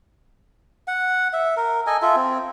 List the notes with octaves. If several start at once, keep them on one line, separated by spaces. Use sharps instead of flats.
F#5
E5
A#4
A4 D#5 G#5
F4 A4 E5
C4